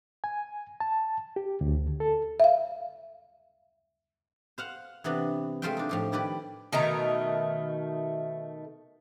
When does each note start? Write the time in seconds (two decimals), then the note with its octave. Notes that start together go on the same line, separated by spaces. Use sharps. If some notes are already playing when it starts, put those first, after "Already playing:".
0.24 G#5
0.80 A5
1.36 G4
1.61 D2
2.00 A4
2.40 E5 F5
4.58 C5 F5 F#5
5.04 C3 E3 B3 D4
5.62 G#3 A3 F4 C5 E5 G5
5.77 D4 D#4
5.89 A2 F3 G4
6.12 D#3 E4 G4 B4 D5
6.72 B2 D#3 A3 A#5